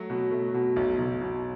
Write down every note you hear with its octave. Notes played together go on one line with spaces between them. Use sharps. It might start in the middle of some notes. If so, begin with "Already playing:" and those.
Already playing: F#3 A3
B2
A3
B2
B1
B1
B2